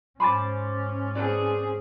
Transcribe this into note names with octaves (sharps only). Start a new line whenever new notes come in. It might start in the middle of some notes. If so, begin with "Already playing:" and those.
G#2 C#4 C5 G#5 B5 C6 D6 A6
C4 G#4 A4 B4 D5